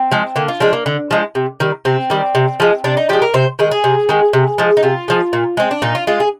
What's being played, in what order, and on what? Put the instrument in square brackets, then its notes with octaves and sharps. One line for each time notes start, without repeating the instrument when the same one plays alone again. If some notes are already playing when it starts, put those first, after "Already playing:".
Already playing: [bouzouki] C4
F3 G#3
D3 A#3
F4
F3 G#3 D4
A#3
D3
F3 G#3
C3
D#3 G3
C3 C4
D#3 G3
C3
F3 G#3
C3 D4
D#4
F3 G#3 G4
A#4
C3 C5
D#3 G#3 G#4
G#4
C3
D#3 G#3
C3
F3 G#3
D#4
C3 F4
F3 G#3
A#2
G#3 C4
D4
A#2 D#4
F4
G#3 F4
G#4